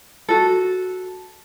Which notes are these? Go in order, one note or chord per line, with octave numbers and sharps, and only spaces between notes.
F#4 A4